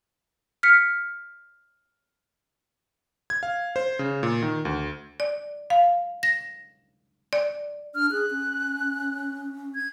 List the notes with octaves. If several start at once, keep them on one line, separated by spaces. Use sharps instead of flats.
F6 B6 C#7
G#6
F5
C5
C#3
A#2
D#3
D2
D5
F5
A#6
D5
D4 F6
G#4 F#6
C#4
G#6